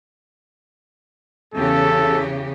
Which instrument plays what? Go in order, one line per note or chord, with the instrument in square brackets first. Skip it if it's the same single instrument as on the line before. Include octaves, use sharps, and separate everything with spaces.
[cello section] E2 C#3 G4 [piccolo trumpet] A4